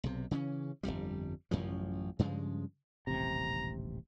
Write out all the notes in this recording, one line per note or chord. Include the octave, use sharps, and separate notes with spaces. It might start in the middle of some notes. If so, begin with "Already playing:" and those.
B1 C3
C#3 E3 C4 C#4
G1 C2 F2 G3
A1 F#2 C#3 F3
G2 C#3 F3 G#3
D#1 A1 C3 A#5